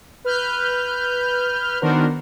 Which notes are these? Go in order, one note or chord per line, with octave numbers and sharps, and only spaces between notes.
B4 F6 G6
D#3 B3 D4 F#4 A#4 C5